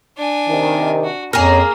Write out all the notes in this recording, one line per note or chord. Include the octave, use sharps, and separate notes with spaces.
D4 G#5
C3 D#3
F#4
F2 A#3 C#4 G#4 A#4 C#5 A#5